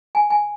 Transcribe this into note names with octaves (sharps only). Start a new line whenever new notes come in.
G#5
G#5